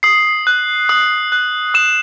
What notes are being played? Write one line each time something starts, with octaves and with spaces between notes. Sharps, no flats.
D#6 C7
F#6
D#6
F#6
D#6 E7